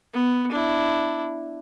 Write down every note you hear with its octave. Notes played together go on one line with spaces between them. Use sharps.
B3
D4 E4